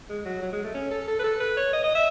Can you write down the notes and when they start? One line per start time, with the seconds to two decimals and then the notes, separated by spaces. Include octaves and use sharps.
0.10 G#3
0.25 F#3
0.42 F#3
0.52 G#3
0.64 A3
0.74 C#4
0.91 A4
1.08 A4
1.19 B4
1.24 A4
1.40 B4
1.57 C#5
1.73 D#5
1.84 D#5
1.95 E5